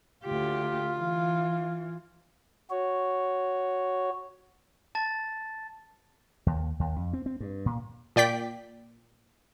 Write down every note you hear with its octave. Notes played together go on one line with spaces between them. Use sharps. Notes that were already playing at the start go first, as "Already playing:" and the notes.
D2 F4 G4
E3
F#4 C#5
A5 A6
D#2
D#2
F2
C4
C4
G2
A#2
A#2 D5 G5 B6